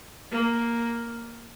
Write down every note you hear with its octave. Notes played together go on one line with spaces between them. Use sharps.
A#3